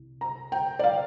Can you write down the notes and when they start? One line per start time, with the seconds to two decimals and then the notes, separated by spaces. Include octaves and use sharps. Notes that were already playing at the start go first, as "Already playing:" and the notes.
Already playing: C2
0.21 A#5
0.52 G5
0.79 D5
0.84 F5